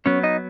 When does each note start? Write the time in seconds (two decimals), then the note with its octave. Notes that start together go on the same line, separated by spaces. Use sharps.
0.06 F#3 B3 C#4 C#5
0.23 D#4 D#5